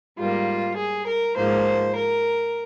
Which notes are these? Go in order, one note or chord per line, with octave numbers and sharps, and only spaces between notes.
G#2 G3 A#3 F4
G#4
A#4
G#2 F3 A#3 C5
A#4